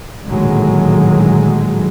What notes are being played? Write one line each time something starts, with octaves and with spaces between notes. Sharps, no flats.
A#1 A2 D3 D#3 F#3 G#3